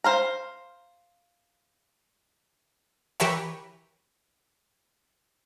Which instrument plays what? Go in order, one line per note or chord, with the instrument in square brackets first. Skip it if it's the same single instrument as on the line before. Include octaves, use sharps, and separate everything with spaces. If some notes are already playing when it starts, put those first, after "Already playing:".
[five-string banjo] C5 F5 A#5
[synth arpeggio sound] E3 G4 A#4 B4 C#5 E5